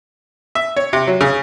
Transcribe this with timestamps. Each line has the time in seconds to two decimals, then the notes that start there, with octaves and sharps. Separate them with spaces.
0.55 E5
0.77 C#5
0.93 C3
1.08 F#3
1.21 C#3